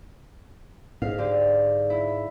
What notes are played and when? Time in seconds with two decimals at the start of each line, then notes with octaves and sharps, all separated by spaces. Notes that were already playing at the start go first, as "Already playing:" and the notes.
1.02 G#2 F5
1.18 D3 G4
1.90 E4